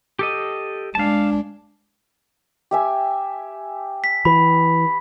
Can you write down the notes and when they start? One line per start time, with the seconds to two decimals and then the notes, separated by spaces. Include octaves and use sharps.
0.19 G4 A4 D#5
0.95 G#3 D4 F5 A5
2.71 G4 E5 G#5
4.04 B6
4.25 E3 B5